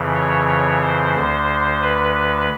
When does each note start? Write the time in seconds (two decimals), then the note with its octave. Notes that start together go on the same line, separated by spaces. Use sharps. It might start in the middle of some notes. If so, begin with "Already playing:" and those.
Already playing: F2 C#3 E3
0.15 C#5
0.48 C#5
0.82 C5
1.14 D2 D3 C5
1.82 B4
2.14 B4